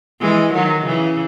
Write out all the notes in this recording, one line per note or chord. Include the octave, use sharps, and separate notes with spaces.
E3 G#3
D#3 F#3
C#3 E3